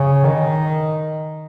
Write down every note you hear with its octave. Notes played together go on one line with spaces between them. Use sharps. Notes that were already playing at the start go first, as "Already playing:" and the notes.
Already playing: C#3
D#3